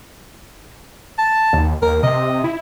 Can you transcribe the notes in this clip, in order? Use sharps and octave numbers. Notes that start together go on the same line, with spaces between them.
A5
D#2
D#2 A#4
C3 D#5
E4